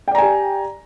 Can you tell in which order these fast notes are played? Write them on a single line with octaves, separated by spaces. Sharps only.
G5 D5 A#5 G#5 G4